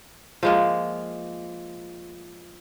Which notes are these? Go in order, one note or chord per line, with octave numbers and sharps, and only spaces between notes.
F3 G#3 A#3